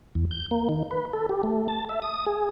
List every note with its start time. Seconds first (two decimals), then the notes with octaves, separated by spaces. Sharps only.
0.15 E2
0.31 G6
0.51 A#3
0.69 D#3
0.91 B4
1.13 A4
1.29 G4
1.43 A3
1.68 A5
1.89 E5
2.02 D#6
2.26 G#4